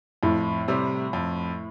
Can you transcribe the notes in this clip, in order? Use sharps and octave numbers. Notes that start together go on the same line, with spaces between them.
F2 A2
C3 G3
F2